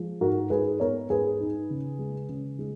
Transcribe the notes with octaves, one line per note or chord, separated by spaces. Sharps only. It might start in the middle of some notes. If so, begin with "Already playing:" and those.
Already playing: F3 G#3
G#2 F#4 A#4
G#2 G#4 B4
B3 A#4 C#5
G#2 G#4 B4
D#4
C#3
G#3
C#3
G#3